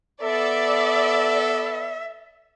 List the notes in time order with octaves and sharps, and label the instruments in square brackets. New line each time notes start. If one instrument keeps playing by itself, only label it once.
[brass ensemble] B3 A4 [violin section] D5 [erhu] E5